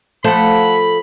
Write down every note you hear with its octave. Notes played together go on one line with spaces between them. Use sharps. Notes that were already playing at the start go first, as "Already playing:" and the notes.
F3 A3 A4 C5 F#5 B5